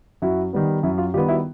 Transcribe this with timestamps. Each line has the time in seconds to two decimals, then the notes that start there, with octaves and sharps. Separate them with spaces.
0.22 F#2 E4 F#4
0.53 D#3 G3 B3
0.83 F#2 E4
0.98 F4
1.14 D#3 G3 B3 F4 G4
1.28 E4 F#4